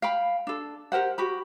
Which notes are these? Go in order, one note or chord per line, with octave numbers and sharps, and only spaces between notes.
F5 G5 B5
D4 A4
G4 A#4 C5 F#5
F#4 G4 B5